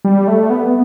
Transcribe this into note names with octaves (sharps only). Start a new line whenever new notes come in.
G3
A3
B3